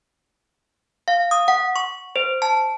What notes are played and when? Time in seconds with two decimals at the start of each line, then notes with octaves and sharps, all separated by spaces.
1.08 F5
1.31 D#6
1.48 F#5
1.76 C#6
2.16 C5
2.42 A5